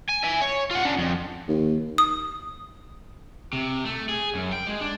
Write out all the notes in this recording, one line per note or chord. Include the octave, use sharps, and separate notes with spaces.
G#5
E5 G#5
C#5
F4 F#5
C#3 D4
F2
D#2
D#6
C3
A3
G#4
F#2
G5
G#3
D4